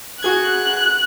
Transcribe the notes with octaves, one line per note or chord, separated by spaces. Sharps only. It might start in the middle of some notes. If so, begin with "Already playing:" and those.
F#4 G#4 F#6 G#6